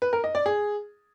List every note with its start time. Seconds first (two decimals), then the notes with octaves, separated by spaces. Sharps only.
0.02 B4
0.13 A#4
0.24 D#5
0.35 D5
0.46 G#4